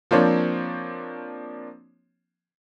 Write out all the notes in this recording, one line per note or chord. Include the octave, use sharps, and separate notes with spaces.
F3 A#3 C4 D4 C#5